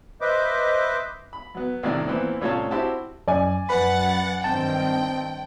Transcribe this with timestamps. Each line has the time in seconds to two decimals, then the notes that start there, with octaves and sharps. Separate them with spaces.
0.21 B4 C5 D#5 E5 D6
1.33 B5
1.55 F#3 B3
1.83 C2 A2 D#3 D4 E4 D5
2.08 A#2 E3 B3 C4 E4
2.41 C2 A2 C#4 F4 C#5 A5
2.71 C4 E4 F#4 G4 A5
3.28 F#2 D5 G#5
3.69 F#2 B4 F#5 B5 A6
4.44 G2 D#3 C4 G5 A5